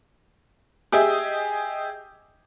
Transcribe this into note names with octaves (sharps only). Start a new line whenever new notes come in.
G4 G#4 D#5 E5